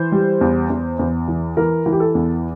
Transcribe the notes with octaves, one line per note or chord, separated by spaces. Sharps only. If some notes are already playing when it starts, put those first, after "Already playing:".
Already playing: E3 C5
G3
E2
E2
E2
E3
E3 A#4
E3
G4
A4
E2